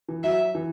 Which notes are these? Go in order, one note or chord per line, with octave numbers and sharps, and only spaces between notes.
E3
F#3 E5
E3